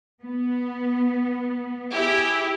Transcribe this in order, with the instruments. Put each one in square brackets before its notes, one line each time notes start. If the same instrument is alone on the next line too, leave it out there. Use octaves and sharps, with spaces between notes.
[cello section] B3
[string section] E4 G4 G#4